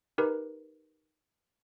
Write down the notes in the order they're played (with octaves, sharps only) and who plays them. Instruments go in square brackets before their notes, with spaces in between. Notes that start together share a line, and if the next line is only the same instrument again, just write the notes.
[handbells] D#4 G4 A#4 B4